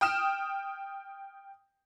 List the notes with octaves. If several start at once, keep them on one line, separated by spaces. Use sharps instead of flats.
G5 D#6 F6 E7